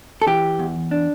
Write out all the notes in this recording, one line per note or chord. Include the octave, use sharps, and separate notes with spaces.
A4
E3 G4
E2
D4